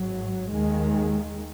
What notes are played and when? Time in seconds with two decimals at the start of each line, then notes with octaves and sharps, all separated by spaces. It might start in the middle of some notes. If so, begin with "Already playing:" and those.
Already playing: G#1 G#2 F#3
0.51 D#2 D#3 G#3